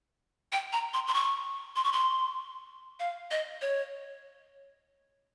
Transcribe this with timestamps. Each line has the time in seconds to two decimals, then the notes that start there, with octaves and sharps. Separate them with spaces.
0.52 G5
0.73 A#5
0.94 C6
1.07 C6
1.14 C#6
1.76 C6
1.84 C#6
1.93 C6
3.00 F5
3.31 D#5
3.61 C#5